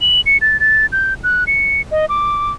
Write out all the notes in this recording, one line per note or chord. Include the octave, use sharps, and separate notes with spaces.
F#7
C#7
A6
A6
G6
F#6
C#7
D#5
D6